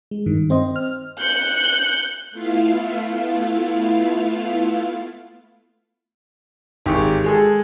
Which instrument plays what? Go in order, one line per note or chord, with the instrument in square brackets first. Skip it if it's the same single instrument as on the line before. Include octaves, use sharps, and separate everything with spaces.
[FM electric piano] G#3
G2 D#3
C4 C5 D#5
F6
[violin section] F#6 G6 C#7
[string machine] A3 B3 E4 F4 F5
[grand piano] G#1 G4 G#4 C#6
G#3 G#4 A4